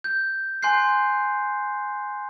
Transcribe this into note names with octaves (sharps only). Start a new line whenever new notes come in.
G6
G#5 C6 F#6 G6 C7